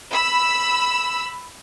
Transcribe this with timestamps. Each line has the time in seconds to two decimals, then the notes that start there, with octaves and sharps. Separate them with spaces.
0.11 B5 E6